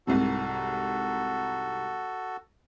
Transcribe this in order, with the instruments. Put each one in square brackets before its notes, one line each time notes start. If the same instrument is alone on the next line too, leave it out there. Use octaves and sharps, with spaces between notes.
[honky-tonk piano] C2 G#2 C3 [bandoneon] F#4 A4